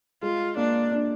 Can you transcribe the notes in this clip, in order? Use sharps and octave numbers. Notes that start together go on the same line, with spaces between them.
G#3 F4
A#3 D4
D4